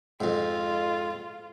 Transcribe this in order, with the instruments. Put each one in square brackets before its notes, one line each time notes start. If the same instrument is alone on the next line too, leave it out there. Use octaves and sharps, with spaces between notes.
[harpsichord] F2 G#2 [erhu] F4